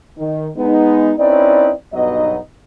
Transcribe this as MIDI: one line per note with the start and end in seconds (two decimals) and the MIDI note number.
0.18 0.49 51
0.57 1.13 56
0.57 1.13 59
0.57 1.13 63
1.18 1.72 60
1.18 1.72 61
1.18 1.72 63
1.18 1.72 64
1.18 1.72 71
1.18 1.72 74
1.94 2.38 35
1.94 2.38 43
1.94 2.38 54
1.94 2.38 59
1.94 2.38 63
1.94 2.38 75